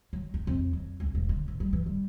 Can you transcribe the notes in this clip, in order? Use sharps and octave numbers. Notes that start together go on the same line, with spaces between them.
F#3
D#4
F2
F#3
C#2
E1
D3
A1
G3
E3
G3